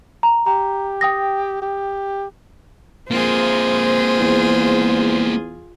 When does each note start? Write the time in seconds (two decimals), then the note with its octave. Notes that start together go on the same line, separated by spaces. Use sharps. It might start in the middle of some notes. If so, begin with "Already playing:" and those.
0.23 A#5
0.46 G4 A#5
1.01 G5 D#6 A#6
1.62 G4
3.11 A#3 C4 F4 G#4 C5
4.20 E2